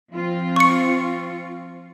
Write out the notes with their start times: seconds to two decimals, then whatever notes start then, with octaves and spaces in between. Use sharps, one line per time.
0.12 F3 C4 F4
0.56 C#6 C#7